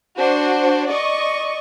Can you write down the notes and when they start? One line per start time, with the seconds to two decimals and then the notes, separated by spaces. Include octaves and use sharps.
0.17 D4 F#4 C5
0.89 D5 D#5 C#6